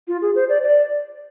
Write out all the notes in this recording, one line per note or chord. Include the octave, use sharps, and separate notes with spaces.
F4
G#4
C5
D5
D5